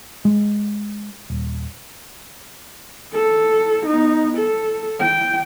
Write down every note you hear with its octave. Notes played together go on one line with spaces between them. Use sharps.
G#3
D#1
A4
B3 D#4
A4
G5